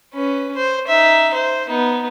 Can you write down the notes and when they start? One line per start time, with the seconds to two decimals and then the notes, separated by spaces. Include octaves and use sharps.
0.14 C#4 B4
0.57 C5
0.87 D#4 E5
1.34 C5
1.68 B3 D#4